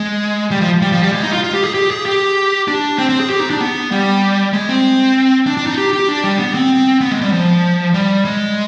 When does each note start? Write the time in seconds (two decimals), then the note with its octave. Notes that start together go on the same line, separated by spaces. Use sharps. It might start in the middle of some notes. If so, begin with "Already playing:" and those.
Already playing: G#3
0.51 G3
0.61 F3
0.82 G3
0.92 F3
1.03 G3
1.13 G#3
1.23 D#4
1.33 F4
1.44 F4
1.54 G4
1.64 G#4
1.74 G4
1.91 G#4
2.06 G4
2.68 D4
2.99 C4
3.09 C4
3.20 G#4
3.30 G4
3.40 D#4
3.50 D4
3.61 B3
3.92 G3
4.53 G#3
4.69 C4
5.47 D4
5.57 D4
5.67 D#4
5.77 G4
5.93 G4
6.08 D4
6.24 G3
6.39 B3
6.55 C4
7.01 B3
7.11 G#3
7.21 G3
7.32 F3
7.94 G3
8.25 G#3